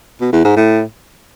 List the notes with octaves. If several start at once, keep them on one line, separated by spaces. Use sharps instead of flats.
B2
E2
G#2
A2